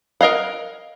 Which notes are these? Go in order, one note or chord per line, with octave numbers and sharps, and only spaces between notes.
A#4 D#5 F5 F#5